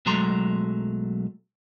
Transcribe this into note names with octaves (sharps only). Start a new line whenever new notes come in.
B1 F#3 G#3 A3 A#5 C6